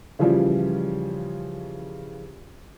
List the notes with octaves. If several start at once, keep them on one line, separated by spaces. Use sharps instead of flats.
C#3 E3 F3 G3